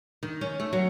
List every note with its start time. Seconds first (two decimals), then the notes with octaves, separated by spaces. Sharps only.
0.23 D#3
0.41 C#4
0.60 A3
0.73 F#3